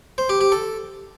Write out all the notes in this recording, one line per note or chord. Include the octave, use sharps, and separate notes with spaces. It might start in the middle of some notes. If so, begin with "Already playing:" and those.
C5
G4
G4
A4